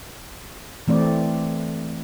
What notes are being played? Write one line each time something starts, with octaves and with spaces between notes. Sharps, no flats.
E3 A3 C4 D5